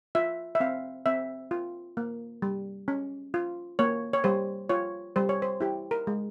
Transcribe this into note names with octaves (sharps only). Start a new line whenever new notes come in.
F4 E5
E5
C4 F5
C4 E5
F4
A#3
G3
C#4
F4
A#3 C#5
C#5
G3 C5
F4 C#5
G3 C5
C#5
C5
E4 G4
A#4
G#3